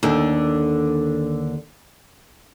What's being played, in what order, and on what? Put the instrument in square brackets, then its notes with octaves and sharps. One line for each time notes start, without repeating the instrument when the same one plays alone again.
[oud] D#2 D3